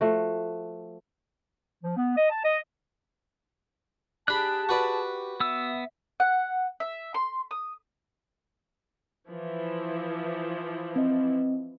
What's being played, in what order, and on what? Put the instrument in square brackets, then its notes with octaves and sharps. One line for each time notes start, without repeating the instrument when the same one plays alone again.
[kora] F3 A3 F#4
[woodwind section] F3
B3
D#5
A5
D#5
[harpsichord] D4 B5 [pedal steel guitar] G4 F#6 [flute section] G#4 A5
[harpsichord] F#4 B4 D5
[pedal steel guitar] B3 E6 [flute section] E5
[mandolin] F#5
E5
C6
D#6
[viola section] E3 F3 E4
[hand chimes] C4 D#5